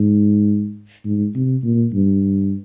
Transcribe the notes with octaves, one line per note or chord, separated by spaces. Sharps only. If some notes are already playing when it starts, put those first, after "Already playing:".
Already playing: G#2
G#2
C3
A#2
G2